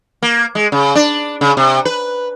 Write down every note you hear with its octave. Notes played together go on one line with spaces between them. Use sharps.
A#3
G#3
C#3
D4
C#3
C3
B4